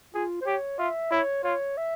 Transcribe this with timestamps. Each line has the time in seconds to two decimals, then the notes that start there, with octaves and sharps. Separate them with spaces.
0.15 F4 G#4
0.41 C5
0.46 G4 C#5
0.79 F4 E5
1.11 E4 C#5
1.44 F4 C#5
1.77 E5